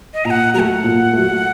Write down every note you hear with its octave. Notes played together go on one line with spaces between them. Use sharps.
D#5
A#2 A#5
F#5
F#3 A3 F#5 A#5
A#2
F#3 A3